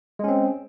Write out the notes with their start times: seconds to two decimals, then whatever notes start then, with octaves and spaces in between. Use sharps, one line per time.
0.19 G#3
0.24 C#4
0.28 C4